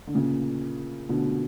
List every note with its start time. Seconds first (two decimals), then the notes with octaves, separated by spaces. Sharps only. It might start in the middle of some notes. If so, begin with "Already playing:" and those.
0.07 D3
0.15 A#2 C#3
1.09 B2 D3